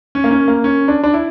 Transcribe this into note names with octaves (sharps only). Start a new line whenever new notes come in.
C#4
A#3
C#4
A#3
C#4
D4
D4
E4